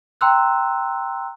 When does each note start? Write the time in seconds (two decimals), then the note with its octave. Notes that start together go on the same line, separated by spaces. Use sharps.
0.21 G5 A#5 C6 E6 F#6